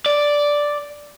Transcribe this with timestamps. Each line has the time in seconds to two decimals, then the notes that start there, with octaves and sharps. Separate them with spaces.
0.06 D5